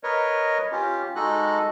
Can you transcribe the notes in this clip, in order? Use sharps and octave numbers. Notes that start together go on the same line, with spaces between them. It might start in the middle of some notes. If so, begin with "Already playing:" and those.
A#4 B4 C#5 D#5
C#4 F4 G4
G#3 D#4 F#4 A4 D#5 F#6